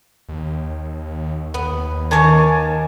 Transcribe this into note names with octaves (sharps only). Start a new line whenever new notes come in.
D#2
D#2 B3
D#3 C#5 F5 G#5 A5 D6